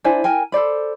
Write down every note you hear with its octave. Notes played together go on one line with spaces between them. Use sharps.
D4 E4 C5 G#5
A#4 G5 G#5
A4 C5 D5 B5